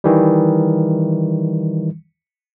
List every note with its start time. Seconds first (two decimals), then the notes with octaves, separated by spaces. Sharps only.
0.04 D#3 E3 G3